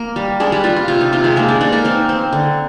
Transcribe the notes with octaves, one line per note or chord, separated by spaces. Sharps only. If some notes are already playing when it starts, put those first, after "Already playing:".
Already playing: A#3 A#4
G3
G#3 D4 G#4
G3 G4
D4 F4
F4
C3 F4
D#4
C3 F4
G#3 G#4
G#3 A#3 A#4
D4 D5
D4 D#4 D5
A#3 A#4
C4 D#4 C5
C4
D3